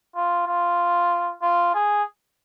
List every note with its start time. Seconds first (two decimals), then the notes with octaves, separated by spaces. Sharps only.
0.16 F4
0.47 F4
1.42 F4
1.74 G#4